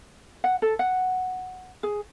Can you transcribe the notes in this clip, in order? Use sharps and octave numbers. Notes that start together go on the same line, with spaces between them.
F#5
A4
F#5
G#4